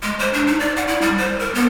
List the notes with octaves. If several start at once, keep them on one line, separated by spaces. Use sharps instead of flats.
G#3
C5
D4
D#4
D5
F#5
E4
G3
C5
A#4
B3